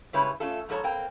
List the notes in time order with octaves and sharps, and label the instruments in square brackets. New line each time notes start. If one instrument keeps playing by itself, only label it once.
[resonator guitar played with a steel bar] C#3 G3 G#3 E4 B4 C#5
A3 C#4 F4 A4
G#2 F3 A4 C#5 A#5
A#3 C4 G5 A#5